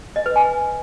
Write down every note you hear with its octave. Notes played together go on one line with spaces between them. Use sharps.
D#5
B4
G#5